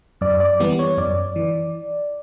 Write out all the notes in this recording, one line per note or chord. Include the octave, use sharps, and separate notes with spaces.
F#2 D5
D5
E3 G3 B3
C#5
F#2 D5
E3